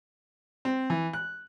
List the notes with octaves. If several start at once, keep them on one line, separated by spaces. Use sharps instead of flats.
C4
E3
F#6